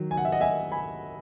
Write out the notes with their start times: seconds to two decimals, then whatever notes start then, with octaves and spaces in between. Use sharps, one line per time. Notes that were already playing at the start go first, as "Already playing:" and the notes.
Already playing: D#3 F#3
0.11 G#5
0.17 F#5
0.25 E5
0.32 D#5 F#5
0.41 E5 G#5
0.72 G#5 B5